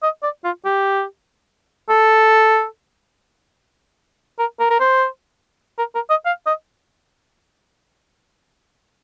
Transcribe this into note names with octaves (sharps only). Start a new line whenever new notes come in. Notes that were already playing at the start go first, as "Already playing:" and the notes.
D#5
D5
F4
G4
A4
A#4
A#4
A#4
C5
A#4
A#4
D#5
F5
D#5